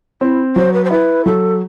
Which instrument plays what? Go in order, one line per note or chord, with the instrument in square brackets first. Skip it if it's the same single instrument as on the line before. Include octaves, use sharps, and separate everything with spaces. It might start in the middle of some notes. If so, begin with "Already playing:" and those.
[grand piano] C4 [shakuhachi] E4
[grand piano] F#3 [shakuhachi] C5
[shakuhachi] B4
C5
[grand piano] E4 [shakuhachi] B4
[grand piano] F#3 [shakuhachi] A4